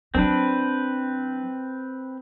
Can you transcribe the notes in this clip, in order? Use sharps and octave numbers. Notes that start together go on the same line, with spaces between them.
F#3 C4 D4 B4